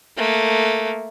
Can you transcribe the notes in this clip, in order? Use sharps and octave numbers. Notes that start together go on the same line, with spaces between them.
A3 A#3